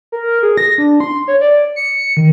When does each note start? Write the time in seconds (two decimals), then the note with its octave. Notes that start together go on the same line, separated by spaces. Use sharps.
0.12 A#4
0.43 G#4
0.58 A#6
0.78 D4
1.00 C6
1.28 C#5
1.41 D5
1.76 C#7
2.17 D#3